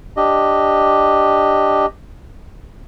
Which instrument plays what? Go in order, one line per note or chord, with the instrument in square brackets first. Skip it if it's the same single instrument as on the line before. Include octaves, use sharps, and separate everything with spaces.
[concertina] D4 G4 D#5